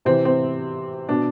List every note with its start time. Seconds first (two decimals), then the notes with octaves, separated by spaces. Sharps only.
0.05 C3 E3 C4
0.25 C4
1.09 B2 D4